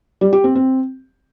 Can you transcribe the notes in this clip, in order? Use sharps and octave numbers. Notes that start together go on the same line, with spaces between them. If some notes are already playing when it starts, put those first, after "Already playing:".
G3
G4
C4
C4